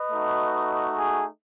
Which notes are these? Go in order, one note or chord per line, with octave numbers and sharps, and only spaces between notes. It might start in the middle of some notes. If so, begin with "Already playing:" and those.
Already playing: B4 D#5
A3 D#4 F#4
G#4